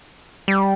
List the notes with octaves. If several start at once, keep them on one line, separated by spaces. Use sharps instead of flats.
G3